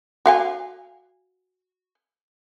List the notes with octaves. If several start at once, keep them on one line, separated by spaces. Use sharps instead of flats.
F#4 F5 G#5